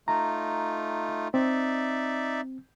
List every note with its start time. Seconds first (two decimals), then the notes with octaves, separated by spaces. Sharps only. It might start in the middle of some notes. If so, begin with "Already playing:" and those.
0.08 A3 D#4 F4 A#5
1.34 C4 D#4 D5 E5